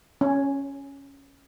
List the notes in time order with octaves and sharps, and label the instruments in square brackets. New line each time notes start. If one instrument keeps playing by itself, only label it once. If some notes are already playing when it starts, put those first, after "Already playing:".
[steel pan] C#4